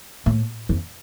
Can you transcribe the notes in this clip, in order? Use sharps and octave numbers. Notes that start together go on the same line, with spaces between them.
A2
F2